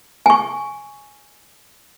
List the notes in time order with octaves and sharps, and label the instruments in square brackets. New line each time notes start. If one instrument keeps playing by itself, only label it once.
[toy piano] G#5 C#6